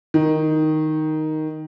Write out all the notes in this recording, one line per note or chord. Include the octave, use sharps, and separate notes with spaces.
D#3